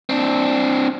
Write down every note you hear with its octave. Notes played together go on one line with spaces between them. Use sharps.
C4 D4